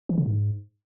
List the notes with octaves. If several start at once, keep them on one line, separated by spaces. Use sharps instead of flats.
E3
C#3
G#2